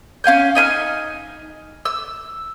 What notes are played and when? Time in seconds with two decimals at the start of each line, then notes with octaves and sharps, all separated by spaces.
0.24 C#4 F5 G#5 G6
0.55 D#4 G#5 B5 F6
1.85 E6